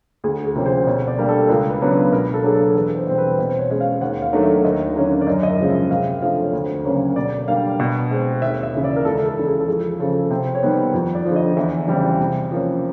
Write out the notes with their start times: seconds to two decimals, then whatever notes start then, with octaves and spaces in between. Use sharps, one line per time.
0.24 D2 G#4
0.45 G#4
0.55 C3 F3 A#3 C#4
0.66 C5
0.87 B2 C#5
1.07 D5
1.18 G3 A#3 D4
1.29 A4
1.49 C#2 A#4
1.70 B4
1.81 C#3 F#3 B3 D4
1.91 B4
2.12 B2 A#4
2.34 A4
2.44 F#3 A#3 D4 G#4
2.54 A4
2.75 E2 B4
2.96 C5
3.07 B2 G3 C4
3.18 B4
3.38 B2 C5
3.50 C5
3.59 C#5
3.70 G#3 C#4
3.80 F5
4.01 D#2 F#5
4.22 F5
4.33 D#3 F#3 A3 D4
4.43 E5
4.64 D#2 D#5
4.96 D3 F#3 A#3 C#4
5.21 D5
5.27 F#2 D#5
5.43 D#5
5.48 E5
5.59 C#3 F3 G#3 C#4
5.70 E5
5.90 C3 F5
6.22 F3 A3 D4 F5
6.43 C#5
6.53 D2 C5
6.85 C#3 F#3 A#3 C#4 C#5
7.16 B2 D5
7.48 G3 A#3 D4 F5
7.80 B2
8.11 G#3 C4
8.42 D#2 E5
8.63 E5
8.73 C#3 E3
8.84 D5
8.96 A#4
9.05 C#2 A4
9.26 A4
9.37 C#3 E3
9.47 G#4
9.60 A4
9.68 F2 G#4
10.00 C#3 F3 A4
10.30 C3 C5
10.55 C#5
10.63 D#3 G3 B3 C5
10.94 F2
11.15 D5
11.26 D3 F3
11.36 D#5
11.57 E2 E5
11.88 C#3 E3 G3 C4
12.20 C3
12.52 F3 A#3 C#4